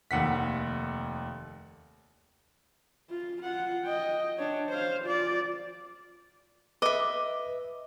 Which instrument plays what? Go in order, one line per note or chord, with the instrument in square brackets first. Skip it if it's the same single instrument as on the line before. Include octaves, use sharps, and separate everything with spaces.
[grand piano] F1 D#2 F#5 B6
[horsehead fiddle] F4
F4 F#5
D#5 G5
D4 C#5
C5 F5
F4 D5
[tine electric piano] B4 [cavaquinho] D#5 E5 [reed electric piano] D6